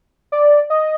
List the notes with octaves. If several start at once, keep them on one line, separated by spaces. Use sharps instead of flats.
D5
D#5